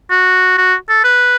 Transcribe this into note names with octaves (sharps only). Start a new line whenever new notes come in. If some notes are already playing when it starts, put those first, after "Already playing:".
F#4
F#4
A4
B4